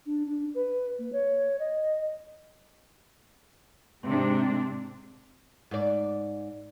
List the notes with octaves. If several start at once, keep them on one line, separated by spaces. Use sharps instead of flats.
D4
D4
B4
A#3
C#5
D#5
G#2 C3 G#3 C4 D4
G#2 D5